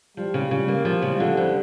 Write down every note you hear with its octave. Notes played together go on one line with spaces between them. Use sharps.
F3 G3
C#3
C#3
G3 A#3
F3
C#3
D3 G3
F2